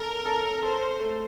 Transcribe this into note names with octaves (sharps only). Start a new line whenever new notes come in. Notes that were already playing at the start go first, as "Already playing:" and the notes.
Already playing: A4 A#4
A4
A4 C5
A3